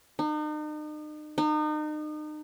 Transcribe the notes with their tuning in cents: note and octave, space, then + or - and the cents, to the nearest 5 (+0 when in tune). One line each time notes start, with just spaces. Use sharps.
D#4 -40
D#4 -35